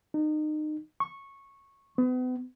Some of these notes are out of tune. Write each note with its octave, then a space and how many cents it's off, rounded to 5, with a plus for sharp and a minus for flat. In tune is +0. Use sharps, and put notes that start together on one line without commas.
D#4 -30
C#6 -10
B3 +40